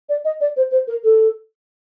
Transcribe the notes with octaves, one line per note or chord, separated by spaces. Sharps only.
D5
D#5
D5
C5
C5
A#4
A4